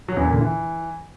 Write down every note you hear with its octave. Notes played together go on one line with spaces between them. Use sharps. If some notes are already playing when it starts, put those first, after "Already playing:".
F#3
E2
A#2
D3
E3